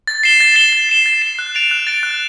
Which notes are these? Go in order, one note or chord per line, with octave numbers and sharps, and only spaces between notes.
A6
C7 E7 G7
A6
C7 E7 G7
A6
C7 E7 G7
A6
C7 E7 G7
F#6
A6 D7 F7
F#6
A6 D7 F7
F#6